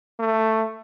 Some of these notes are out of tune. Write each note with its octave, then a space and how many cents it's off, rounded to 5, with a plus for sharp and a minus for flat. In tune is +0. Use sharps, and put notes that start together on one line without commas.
A3 +10